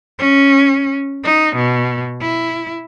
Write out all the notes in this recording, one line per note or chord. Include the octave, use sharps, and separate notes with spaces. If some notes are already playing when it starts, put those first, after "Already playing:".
C#4
D#4
B2
E4